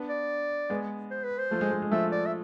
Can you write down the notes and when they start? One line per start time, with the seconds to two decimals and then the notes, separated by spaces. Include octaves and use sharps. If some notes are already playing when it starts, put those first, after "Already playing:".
Already playing: B3 D4
0.09 D5
0.70 G#3 B3
1.11 C5
1.24 B4
1.38 C5
1.51 F3 A3
1.61 G#3
1.72 G#3
1.82 G#3
1.91 F3 A3 E5
2.12 D5
2.26 E5